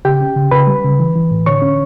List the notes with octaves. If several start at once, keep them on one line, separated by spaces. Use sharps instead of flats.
C#3 G4 G5
C#4
C#3
C#3 B4 B5
G3
C#3
E3
E3
A2
D3 C#5 C#6
C#4